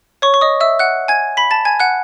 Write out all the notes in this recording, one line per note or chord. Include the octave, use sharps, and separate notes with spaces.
C#5 C#6
C#6
D#5 D#6
E5 E6
F#5 F#6
G#5 G#6
B5 B6
A5 A6
G#5 G#6
F#5 F#6